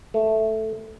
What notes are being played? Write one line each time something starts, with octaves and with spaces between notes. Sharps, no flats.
A3